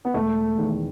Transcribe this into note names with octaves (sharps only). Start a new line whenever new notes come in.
B3
E1 A3
E2 D#3